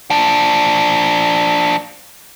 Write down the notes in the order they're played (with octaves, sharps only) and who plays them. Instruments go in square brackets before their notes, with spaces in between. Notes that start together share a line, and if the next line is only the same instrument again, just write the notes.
[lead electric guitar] F3 D4